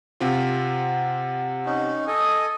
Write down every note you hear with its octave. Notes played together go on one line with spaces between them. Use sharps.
C3 C4 F4 F#5
C#4 D#4
A4 D#5 G#5 D#6